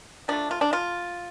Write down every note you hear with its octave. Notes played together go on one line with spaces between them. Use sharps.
F3 A3 D4
F4
D4
F4